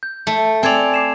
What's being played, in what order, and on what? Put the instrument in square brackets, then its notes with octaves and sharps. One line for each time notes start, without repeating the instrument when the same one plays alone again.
[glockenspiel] G6
[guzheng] A3
[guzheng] C4 D5 [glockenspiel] G#5 G#6 F7
[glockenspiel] D6 C7 E7